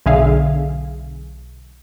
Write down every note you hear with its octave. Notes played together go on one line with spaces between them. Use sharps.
B1 D3 G#4 E5 F5